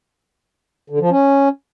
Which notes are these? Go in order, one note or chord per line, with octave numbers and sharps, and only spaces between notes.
D3
F3
C#4